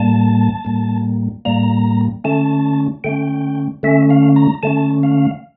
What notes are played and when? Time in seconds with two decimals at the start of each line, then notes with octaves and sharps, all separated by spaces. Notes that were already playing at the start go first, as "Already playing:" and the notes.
Already playing: A2 G3 A#3 A5
0.65 A2 G3 A#3
1.45 A2 G3 A#3 A#5
2.24 D3 A3 C#4 A5
3.04 D3 A3 C#4 G5
3.83 D3 A3 C#4 E5
4.10 F5
4.36 A#5
4.63 D3 A3 C#4 A5
5.03 F5